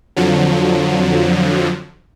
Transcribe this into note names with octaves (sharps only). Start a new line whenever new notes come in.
F2 D3 F3 F#3